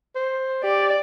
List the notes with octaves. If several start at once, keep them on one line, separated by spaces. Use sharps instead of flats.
C5
G4 D5